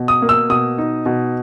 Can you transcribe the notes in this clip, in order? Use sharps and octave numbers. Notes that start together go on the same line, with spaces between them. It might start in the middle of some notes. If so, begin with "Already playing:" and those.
Already playing: B2
D#6
A#3
E6
B2 D#6
D#4
B2